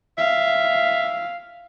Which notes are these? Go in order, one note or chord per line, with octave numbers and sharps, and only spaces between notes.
E5 F5